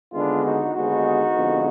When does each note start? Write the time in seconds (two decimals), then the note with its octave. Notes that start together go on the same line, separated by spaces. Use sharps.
0.14 D#2 D3 G#3 B3 D4 F4
0.44 D#4 F#4
0.75 D#2 D3 G#3 B3 D#4 F#4
1.35 F2 D3 G#3 B3